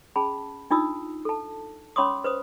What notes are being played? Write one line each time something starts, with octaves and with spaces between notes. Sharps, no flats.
C#4 G#4 A5 B5
D4 D#4 F4 D#6 E6
A4 A5
C#4 C#5 B5 C6 D6 D#6
B4 C5 D#6